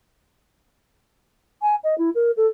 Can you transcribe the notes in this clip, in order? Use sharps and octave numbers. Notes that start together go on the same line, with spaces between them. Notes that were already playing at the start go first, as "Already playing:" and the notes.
G#5
D#5
E4
A#4
A4